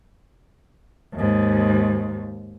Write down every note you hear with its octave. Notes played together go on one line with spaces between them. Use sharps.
D#2 G#2